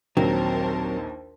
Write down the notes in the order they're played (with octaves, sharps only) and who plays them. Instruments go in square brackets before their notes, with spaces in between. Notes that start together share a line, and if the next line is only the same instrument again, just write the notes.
[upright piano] A#1 D#2 [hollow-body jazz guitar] F#3 [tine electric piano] C4 [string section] A#4 C5 A5